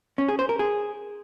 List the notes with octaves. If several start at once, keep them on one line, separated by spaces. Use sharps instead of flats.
C#4
G#4
C5
A#4
G#4